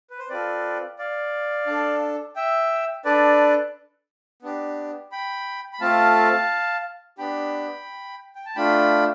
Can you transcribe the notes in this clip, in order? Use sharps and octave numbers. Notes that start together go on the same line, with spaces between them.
B4
C5
C4 F4 A4 B4 D5
D5 F5
D4 A4
E5 G5
D4 A4 B4 D5
B3 D4 G4
G5 B5
B5
A3 C4 F4 A4 F5 A5
B3 D4 G4 G5 B5
G5
A5
A3 D4 F4 G5 B5